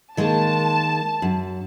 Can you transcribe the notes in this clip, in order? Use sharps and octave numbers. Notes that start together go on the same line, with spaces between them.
D#3 G#3 A#3 A5
F#2